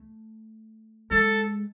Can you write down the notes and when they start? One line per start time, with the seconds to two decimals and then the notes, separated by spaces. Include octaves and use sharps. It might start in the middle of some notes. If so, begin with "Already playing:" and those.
Already playing: A3
1.11 G#3 A4